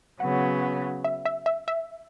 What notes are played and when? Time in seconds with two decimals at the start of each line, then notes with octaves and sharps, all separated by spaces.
0.20 C#3 F#3 B3 F#5
1.05 E5
1.26 E5
1.46 E5
1.68 E5